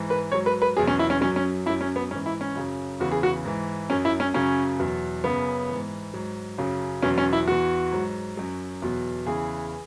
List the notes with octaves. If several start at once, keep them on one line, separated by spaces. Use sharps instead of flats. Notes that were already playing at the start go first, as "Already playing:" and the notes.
Already playing: G#2 E3
B4
G#2 F#3 C#5
B4
B4
E2 B2 F#3 G#4
C#4
E4
C#4
F#2 F#3 C#4
C#4
F#2 F#3 E4
C#4
B3
G#2 E3 C#4
E4
C#4
F#2 C#3 F#3
E2 C#3 E3 F#4
G#4
F#4
G#2 E3
F#2 F#3 C#4
E4
C#4
F#2 C#3 F#3 C#4
E2 B2 F#3
F#2 C#3 F#3 B3
G#2 E3
G#2 F#3
F#2 C#3 F#3
E2 B2 F#3 C#4
C#4
E4
E2 E3 F#4
G#2 F#3
F#2 F#3
E2 B2 F#3
E2 C#3 E3 G#4